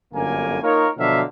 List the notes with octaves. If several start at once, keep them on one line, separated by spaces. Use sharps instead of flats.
G1 F#2 D3 A#3 A#4 G#5
A#3 D#4 F4 A#4 C#5
B2 D3 F3 F#3 E5 F5